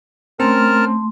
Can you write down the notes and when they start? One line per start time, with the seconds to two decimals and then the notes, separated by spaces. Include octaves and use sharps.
0.40 A3 C4 C#4 A#4 A5 C6 F6